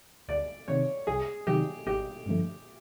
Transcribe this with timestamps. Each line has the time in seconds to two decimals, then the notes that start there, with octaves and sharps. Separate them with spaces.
0.28 D2 D5
0.68 C3 D#3 C#5
1.07 C2 G#4
1.47 C3 D#3 F#3 G4
1.86 G#1 G4
2.26 G2 D3 F3 A3